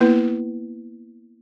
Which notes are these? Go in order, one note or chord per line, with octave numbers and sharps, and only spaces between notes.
A#3 B3 E4 B4